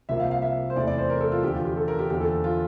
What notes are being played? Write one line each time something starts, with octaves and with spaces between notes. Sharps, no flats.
C2 C3 F3 A#3 E5
F5
F5
E5
C5
E2 C3 E3 A3 D5
D5
C5
A#4
A4
F4
E2 D3 F3 G4
F4
G4
A4
A#4
G4
E2 D3 F3 A#3 G4
A4
F4